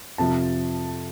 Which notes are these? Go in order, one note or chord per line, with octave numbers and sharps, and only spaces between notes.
F2 C3 F3 A5